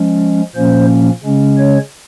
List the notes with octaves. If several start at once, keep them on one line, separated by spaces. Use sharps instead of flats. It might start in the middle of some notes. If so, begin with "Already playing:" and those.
Already playing: F3 G#3 C#4
A#2 F3 A#3 C#4 C5
C#3 G#3 C#4
C#5